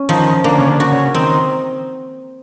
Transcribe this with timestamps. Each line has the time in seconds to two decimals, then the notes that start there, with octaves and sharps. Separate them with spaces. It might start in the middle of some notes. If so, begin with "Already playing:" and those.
Already playing: C#4
0.09 D#3 F3
0.44 D3 A#3
0.58 C#3
0.68 D3
0.80 F#4
0.92 C#3
1.14 D#3 C4